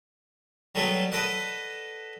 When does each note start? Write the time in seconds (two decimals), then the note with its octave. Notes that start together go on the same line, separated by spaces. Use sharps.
0.75 F#3 G3 A3 B3 A4
1.12 A4 B4 D5 D#5 F#5